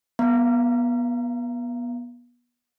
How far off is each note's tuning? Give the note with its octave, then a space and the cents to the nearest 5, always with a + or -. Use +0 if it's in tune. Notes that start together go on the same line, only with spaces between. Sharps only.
B3 -25 F5 -45 A#5 +0